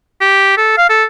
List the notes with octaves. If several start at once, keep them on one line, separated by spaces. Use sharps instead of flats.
G4
A4
F5
A4